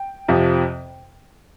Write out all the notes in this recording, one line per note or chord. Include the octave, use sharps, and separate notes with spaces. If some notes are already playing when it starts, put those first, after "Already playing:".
Already playing: G5
F2 C3 F3